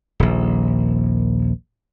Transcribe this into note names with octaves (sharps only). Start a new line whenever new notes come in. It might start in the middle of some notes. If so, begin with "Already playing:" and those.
D#1 A#1